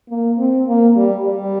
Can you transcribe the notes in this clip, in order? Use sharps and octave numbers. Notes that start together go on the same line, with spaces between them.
A#3
C4
A#3
G3
G3